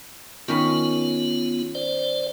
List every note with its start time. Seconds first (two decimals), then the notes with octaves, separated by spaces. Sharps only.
0.48 D#3 B3 C#4 F4 B5
1.75 C5 D5